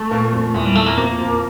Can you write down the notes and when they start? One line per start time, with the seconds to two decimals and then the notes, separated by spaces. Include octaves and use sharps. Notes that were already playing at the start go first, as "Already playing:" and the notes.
Already playing: A3
0.11 A#2 A#3
0.32 F2 F3
0.54 E2 E3 G#3
0.65 G3
0.75 A3
0.86 A#3
0.97 F2 F3 A#3
1.19 F2 F3